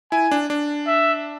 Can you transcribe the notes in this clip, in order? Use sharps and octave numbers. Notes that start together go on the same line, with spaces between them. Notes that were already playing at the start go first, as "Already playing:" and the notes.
E4 G#5
D4
D4
E5